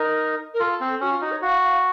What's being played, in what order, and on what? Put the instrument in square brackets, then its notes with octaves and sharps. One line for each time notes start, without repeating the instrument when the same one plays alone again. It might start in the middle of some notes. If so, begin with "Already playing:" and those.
Already playing: [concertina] D#4 [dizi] A#4
[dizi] A#4
[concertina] F4 [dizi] A4
[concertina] C4
[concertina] C#4 [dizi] F#4
[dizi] F4
[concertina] D#4 [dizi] F#4
[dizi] C#5
[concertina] F#4 [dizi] F5
[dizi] F5